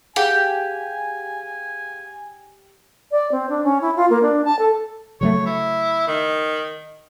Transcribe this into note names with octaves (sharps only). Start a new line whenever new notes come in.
G4 G#4 F5 F#5 G#5
D5
C4
D4
C#4
E4
F4
A#3
D4
A5
A4
C#3 F#3 A3 C#5
E4
D#3